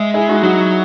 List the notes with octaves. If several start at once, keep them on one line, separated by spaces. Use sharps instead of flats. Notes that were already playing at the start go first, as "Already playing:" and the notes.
Already playing: G#3 E5
E4 G#4
D#4 F#4
F#3 D#4 F#4